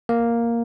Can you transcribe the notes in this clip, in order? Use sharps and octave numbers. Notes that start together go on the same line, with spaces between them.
A#3